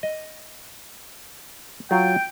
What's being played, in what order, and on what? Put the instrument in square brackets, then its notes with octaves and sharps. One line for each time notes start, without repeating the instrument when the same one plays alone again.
[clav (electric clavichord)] D#5
[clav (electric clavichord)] F#3 F4 [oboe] G5